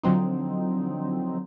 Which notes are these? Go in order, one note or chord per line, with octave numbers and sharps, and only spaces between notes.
D3 F3 F#3 C4 D#4